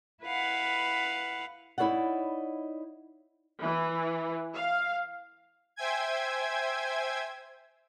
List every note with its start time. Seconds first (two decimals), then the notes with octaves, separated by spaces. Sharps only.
0.24 E4 B4 F5 F#5
1.78 D#4 E4 A4 C#5 D5 F#5
3.62 E3
4.55 F5
5.76 C5 E5 G5 G#5 G#6